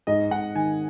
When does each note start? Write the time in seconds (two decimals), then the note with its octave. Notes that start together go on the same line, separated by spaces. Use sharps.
0.07 G#2 D#5
0.31 G#2 F#5
0.55 D#3 G#5